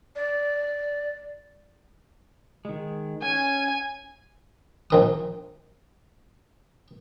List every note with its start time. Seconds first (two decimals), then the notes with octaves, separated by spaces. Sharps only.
0.16 D5
2.65 D#3 G#3
3.22 C#4 G#5
4.90 A#1 D#3 D#6